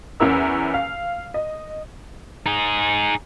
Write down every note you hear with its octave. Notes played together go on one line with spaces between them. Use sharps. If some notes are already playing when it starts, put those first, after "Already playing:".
E2 C#4 E4 A#4 E6
F5
D#5
D#4 G#4